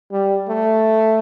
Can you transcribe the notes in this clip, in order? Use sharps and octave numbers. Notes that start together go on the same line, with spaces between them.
G3
A3